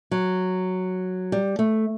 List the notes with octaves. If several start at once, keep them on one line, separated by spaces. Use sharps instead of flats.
F#3
G3
A3